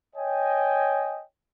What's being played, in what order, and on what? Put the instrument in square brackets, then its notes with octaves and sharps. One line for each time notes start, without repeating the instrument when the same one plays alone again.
[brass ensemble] C#5 D#5 G5 G#5